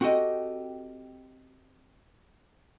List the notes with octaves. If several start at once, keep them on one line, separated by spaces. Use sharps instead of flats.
C4 F#4 G4 A4 D#5 G5